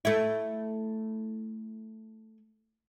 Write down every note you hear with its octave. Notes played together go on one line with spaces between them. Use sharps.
A3 E4